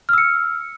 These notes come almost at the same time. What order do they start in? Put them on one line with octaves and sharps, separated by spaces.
F6 E6 C#7